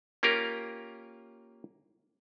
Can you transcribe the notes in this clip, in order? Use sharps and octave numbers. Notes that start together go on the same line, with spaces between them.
A#3 C#4 F4 G4 A#4